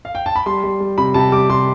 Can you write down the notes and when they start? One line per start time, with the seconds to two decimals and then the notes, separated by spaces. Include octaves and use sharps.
0.05 F5
0.15 G5
0.26 A5
0.36 B5
0.46 G3 C6
0.64 G3
0.80 G3
0.98 C3 B5
1.14 C3 A5
1.32 G3 D6
1.49 C3 C6